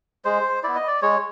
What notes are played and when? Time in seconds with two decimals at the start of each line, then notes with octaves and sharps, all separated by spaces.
0.25 G#3 C5
0.63 B3 E4 D5
0.75 D#5
0.87 D5
1.02 G#3 C#5